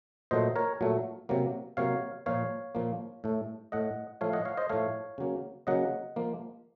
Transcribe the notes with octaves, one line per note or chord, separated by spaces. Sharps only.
A#2 F#3 A3 C5 D#5
A#4 C#5
A#2 F#3 A3
C3 F#3 A#3
C3 F#3 A#3 C#5 F5
A#2 F3 A#3 C#5 F5
A#2 F3 A#3
A2 A3
A2 A3 D#5 F#5
A2 F3 A3 C#5 F5
D#5 F#5
C#5 F5
C5 D#5
A2 F3 A3 C#5 F5
C#3 F#3 A#3
C#3 F#3 A#3 D#5 F#5
F3 A#3